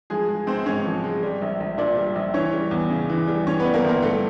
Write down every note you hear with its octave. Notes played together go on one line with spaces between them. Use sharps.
F3 G#3 G#4
G#3
G#1 C4 C5
G#2 C#4 C#5
F3
G#3
G3
A#1
A#1
A#2 D4 D5
G3
A#1
E3 C#4 C#5
G3
E2
C#3
E3
G3
E3 C#4 C#5
B3 B4
G3
A#3 A#4
G1 A#3 A#4
G2 A3 A4